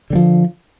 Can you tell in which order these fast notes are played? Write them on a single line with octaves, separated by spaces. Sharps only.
D3 G3 F3